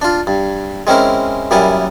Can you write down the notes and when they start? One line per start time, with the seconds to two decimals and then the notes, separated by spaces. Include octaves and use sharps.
0.02 D4 F4
0.27 G2
0.87 G#3 C4 C#4 E4 A#4
1.51 F#2 G3 A#3 B3 E4 G#5